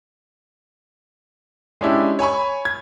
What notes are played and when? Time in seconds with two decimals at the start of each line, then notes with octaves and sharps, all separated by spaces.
1.81 G#3 C#4 D4 E4 G4
2.19 C#5 G#5 B5 C#6
2.65 G#6